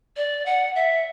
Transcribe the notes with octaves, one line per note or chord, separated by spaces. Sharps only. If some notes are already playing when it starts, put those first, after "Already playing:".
D5
F#5
E5